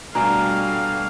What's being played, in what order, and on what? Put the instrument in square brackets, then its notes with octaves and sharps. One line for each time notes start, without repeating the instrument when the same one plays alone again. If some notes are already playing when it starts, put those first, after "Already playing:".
[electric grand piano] B2 D4 [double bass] G3 A3 [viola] F5 [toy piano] G#5 A#5